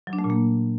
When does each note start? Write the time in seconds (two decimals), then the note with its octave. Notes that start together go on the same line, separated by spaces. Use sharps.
0.07 F#3
0.13 D4
0.19 A3
0.24 A#2
0.30 A#3